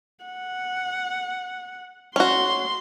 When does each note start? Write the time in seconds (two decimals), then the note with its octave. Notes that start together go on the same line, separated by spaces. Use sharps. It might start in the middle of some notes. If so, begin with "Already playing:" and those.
0.25 F#5
2.16 C#4 F#4 C6